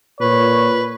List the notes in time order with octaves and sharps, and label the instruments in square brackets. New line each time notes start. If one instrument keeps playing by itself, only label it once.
[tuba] A#2 [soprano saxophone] B4 [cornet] C#5